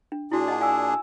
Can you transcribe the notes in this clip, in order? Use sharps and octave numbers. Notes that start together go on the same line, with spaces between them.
D4
A#2 D4 E4 F#4 G#4
D#5 F#5 A5
F5 G#5 E6